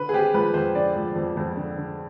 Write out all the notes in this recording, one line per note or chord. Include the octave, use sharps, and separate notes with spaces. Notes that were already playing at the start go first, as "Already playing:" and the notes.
Already playing: D3 B4
G#4
C4 G4
F3 B4
F2 C5
D3 D5
F3
F2
F2
D3
D3